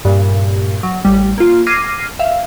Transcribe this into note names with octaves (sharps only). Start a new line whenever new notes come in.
G2 A#2
F#3
A1 G3
A#3 F4
D6 F6 G#6 A#6 C7 D#7
E5 F5